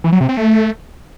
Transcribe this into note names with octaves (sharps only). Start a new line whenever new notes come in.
E3
F#3
C3
C4
A3